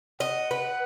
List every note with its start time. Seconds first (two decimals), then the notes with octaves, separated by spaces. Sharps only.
0.20 D#5 F#5
0.51 B4